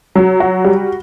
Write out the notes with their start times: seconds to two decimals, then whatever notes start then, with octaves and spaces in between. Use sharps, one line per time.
0.15 F#3
0.40 F#4
0.64 G3